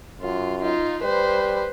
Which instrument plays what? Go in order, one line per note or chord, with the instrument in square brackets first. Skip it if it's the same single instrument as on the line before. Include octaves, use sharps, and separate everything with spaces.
[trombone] F#2 [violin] F4
[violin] D#4 F4
[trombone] G3 [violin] B4 C5